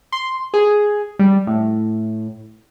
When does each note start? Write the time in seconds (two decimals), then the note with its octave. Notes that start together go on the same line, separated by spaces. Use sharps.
0.12 C6
0.54 G#4
1.19 G3
1.47 A2